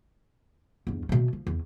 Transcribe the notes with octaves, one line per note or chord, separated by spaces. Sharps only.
E2 G2
B2 A3
F3
E2